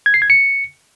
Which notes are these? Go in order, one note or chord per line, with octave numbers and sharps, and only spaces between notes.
G#6
C7
G#6
C#7